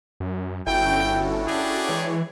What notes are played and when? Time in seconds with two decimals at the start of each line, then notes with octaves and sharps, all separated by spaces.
0.20 F#2
0.67 G1 C#4 E4 F#4 A4 G5
1.47 D4 G4 G#4
1.89 E3 G#3 C#5